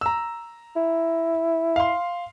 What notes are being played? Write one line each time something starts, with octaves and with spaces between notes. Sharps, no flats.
A#5 E6
E4
F5 C6